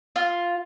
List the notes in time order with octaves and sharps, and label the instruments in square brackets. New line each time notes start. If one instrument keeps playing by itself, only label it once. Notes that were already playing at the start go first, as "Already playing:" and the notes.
[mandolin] F4